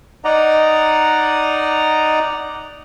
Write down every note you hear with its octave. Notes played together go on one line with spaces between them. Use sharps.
D#4 D5 D#5 F#5 A#5